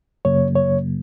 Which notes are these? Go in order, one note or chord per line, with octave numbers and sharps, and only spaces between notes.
F#2 C#3 F#3 A#3 C#5
C#5